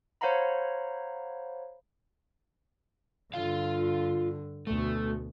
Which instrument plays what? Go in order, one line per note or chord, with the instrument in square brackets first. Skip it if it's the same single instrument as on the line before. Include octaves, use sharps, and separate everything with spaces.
[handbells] C5 C#5 F5 F#5 A#5 B5
[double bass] G2 D3 [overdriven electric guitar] F4 F5
[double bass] D2 B2 [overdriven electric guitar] A3